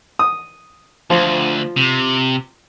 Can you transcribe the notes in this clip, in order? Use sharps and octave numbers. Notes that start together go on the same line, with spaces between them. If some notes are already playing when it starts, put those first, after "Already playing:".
D#6
D2 F3 F4
C3